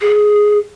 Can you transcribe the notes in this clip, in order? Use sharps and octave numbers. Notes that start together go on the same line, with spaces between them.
G#4